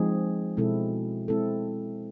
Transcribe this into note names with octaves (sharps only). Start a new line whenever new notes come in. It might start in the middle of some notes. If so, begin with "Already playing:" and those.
Already playing: F3 G#3 C4 D#4 G#4
B2 G#3 C4 E4 A4
G#3 C4 E4 A4